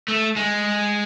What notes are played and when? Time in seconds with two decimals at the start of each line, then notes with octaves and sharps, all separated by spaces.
0.08 A3
0.36 G#3